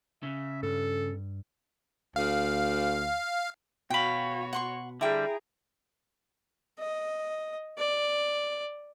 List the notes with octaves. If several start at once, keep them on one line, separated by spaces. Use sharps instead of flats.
C#3 E5
G2 A4
D2 F5
B2 F#4 C#5 F5 G5 B5
F#5 C6 C#6
D3 G3 E4 G#4 G5 A#5
D#5
D5